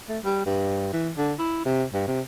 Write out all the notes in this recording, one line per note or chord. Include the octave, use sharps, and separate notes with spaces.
A3
G3
G2
E3
D3
E4
C3
G2
C3